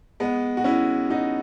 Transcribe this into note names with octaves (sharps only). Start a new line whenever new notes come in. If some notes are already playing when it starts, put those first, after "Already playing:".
G#3 B3
F#4
C#4 E4
D#4 F#4